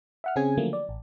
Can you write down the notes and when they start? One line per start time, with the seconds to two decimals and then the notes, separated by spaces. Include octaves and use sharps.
0.24 E5 F#5 F6
0.36 C#3 C4 C#4 G#4 G#5 G#6
0.57 D3 F3 F#3 A3 A#3
0.73 D5
0.89 A1